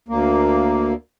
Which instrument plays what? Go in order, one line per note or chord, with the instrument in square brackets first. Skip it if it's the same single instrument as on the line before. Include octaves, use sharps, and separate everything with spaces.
[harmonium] D2 A#3